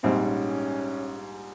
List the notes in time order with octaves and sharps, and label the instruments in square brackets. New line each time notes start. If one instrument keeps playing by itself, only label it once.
[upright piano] A#1 G#2 G3 [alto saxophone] C4
[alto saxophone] C#4